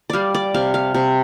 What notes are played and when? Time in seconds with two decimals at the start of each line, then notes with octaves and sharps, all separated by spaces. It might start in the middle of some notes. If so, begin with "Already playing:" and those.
0.10 G3 D5 F5
0.35 D5
0.54 C3 F5
0.74 F5
0.94 C3